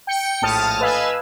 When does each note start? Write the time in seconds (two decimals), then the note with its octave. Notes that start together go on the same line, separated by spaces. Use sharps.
0.07 G5 C#7
0.42 A#1 A2 A5 D#6 F6
0.81 B4 D#5 F5 G#5 E6